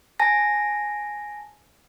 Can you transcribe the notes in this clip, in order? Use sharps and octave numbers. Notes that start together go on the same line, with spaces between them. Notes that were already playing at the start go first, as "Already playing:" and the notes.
G#5 A5 A#6